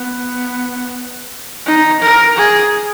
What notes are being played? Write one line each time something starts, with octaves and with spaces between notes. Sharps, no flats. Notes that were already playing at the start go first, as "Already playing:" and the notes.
Already playing: B3
D#4
A#4
G#4